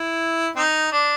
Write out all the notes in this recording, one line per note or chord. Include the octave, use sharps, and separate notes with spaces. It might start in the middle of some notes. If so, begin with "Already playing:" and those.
Already playing: E4
C4 D#4
D4